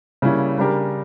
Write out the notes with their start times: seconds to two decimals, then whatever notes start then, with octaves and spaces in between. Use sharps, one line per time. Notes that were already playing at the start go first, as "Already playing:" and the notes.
0.22 C#3 G3 A#3 C#4 E4
0.58 C#3 G3 D4 G4 A#4